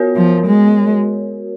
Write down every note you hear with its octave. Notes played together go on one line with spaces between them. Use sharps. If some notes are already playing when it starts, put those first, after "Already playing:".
Already playing: B3 F#4 A#4 C#5
F3
G#3